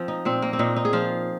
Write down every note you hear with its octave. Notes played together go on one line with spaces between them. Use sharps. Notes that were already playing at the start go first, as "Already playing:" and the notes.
Already playing: F3 C4
D#4
A#2 C4
A#3
C4
A#2 D#4
D#4
G#4
F3 F4